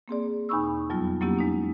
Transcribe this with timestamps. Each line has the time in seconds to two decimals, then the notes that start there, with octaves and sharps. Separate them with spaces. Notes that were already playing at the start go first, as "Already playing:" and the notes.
0.08 A#3 C4 G#4 D5
0.49 E2 B2 D#4 B5 C#6 E6
0.90 F2 F#3 G3 B3 F4
1.21 F#3 A#3 B3 C#4 E4 G4
1.39 G#3 D#4